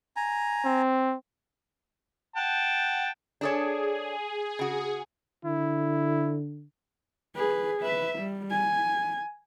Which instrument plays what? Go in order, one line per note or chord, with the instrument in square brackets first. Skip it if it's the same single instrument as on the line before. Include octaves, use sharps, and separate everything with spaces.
[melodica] G#5 A#5
[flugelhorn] C4
[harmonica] F#5 G5 A5
[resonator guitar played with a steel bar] D4 A4 C#5 [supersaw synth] G#4
[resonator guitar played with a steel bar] C#3 F#4
[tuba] D3 [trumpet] E4
[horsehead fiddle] G#4 B4
B4 E5
G3
G#5